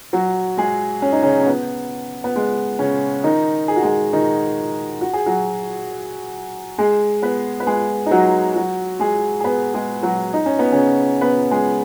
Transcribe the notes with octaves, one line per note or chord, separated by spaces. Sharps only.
F#3 F#4
G#3 G#4
C#4
D#4
C#3 C#4
C#4
B3
B3
G#3
C#3 C#4
D#3 D#4
G#4
F#4
G#3 G#4
D#3 D#4
F#4
G#4
F#3 F#4
G#3 G#4
B3 B4
B4
G#3 G#4
D#4
F#3 F#4
F#3 F#4
G#3 G#4
G#4
B3 B4
G#3 G#4
F#3 F#4
D#4
C#4
B3
C#3 C#4
B3 B4
G#3 G#4